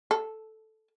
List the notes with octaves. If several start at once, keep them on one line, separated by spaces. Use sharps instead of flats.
A4